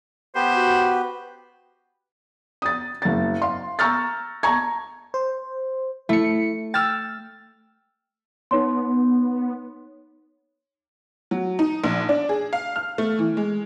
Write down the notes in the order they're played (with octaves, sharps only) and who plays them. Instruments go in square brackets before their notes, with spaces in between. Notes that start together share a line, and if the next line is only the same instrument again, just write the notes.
[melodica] B3 G4 B4 [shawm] C5
[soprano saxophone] F#4
[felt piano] D#6 A6
F#1 A6
F5 C6
A#5 C#6 E6 F6 G6 A6
A5 A#5 C#6 G#6
[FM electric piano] C5
[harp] A3 [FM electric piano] E4 C#7
[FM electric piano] G5 [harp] E6 F6 A6
[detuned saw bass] B3 [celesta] D#4 C#5 C6
[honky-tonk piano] F#3
D#4
A#1
D4
G#4
F5
F6
A3
E3
G#3